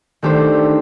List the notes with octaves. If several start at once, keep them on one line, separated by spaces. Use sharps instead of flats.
D#3 A3 D4 G4 C5